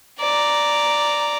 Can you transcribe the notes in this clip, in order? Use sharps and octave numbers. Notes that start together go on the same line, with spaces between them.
D5 A#5